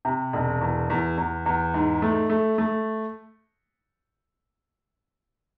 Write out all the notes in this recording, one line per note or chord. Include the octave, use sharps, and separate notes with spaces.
C3
E1
E2
E2
E2
E2
G#2
A3
A3
A3